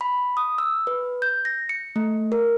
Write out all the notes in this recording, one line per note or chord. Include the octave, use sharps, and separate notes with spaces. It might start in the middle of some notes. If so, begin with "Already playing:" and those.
B5
D#6
E6
B4
G6
A#6
C#7
A3
A#4